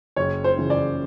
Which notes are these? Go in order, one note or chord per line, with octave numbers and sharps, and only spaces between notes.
F#1 C#5
C5
F#2 C#3 E3
D5